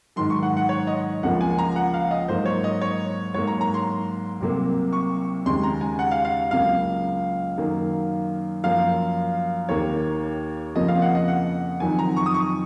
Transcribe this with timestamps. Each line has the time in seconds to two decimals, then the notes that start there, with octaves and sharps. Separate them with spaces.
0.16 G#2 D#3 F#3 C6
0.30 C#6
0.43 F#5
0.57 F#5
0.69 C#5
0.87 D#5
1.23 C#2 C#3 F3 A#3 F#5
1.41 G#5
1.58 A#5
1.76 F#5
1.94 F5
2.11 D#5
2.28 G#2 F#3 A#3 C5
2.45 C#5
2.64 D#5
2.81 C#5
3.34 G#2 F#3 A#3 C#5
3.47 A#5
3.61 A#5
3.74 C6
4.40 C2 C3 F#3 A#3
4.93 C#6
5.46 D#2 C#3 G#3 C6
5.63 A#5
5.81 G#5
5.99 F#5
6.11 F5
6.25 F5
6.51 C#2 C#3 F#3 A#3 F5
7.58 F#2 D#3 F#3 A#3
8.64 F#2 F3 A#3 F5
9.69 D#2 D#3 A#3 C#5
10.75 F2 C#3 F3 A#3 D#5
10.88 F5
11.02 F#5
11.15 D#5
11.28 F#5
11.80 F2 D#3 F#3 G#5
11.99 A#5
12.17 C#6
12.26 D#6
12.34 C#6